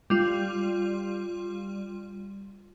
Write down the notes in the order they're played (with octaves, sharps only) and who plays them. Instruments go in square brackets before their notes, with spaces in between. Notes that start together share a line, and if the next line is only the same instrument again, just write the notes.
[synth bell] G3 F4